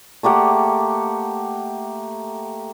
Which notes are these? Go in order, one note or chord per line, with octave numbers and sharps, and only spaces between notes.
A3 A#3 G4 F#5